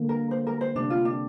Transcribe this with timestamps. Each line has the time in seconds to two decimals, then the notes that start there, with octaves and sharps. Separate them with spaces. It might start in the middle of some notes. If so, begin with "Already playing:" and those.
Already playing: D3 G3 A#3
0.09 A#4
0.31 C5
0.47 A#4
0.61 C5
0.76 C3 G3 C4 D4
0.90 F4
1.05 D4